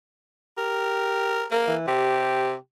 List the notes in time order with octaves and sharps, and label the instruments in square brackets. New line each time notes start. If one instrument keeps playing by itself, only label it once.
[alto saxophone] G4 [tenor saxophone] A#4
[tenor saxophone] A#3 [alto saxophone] A#4
[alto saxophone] E3
[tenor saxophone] C3 [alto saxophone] G4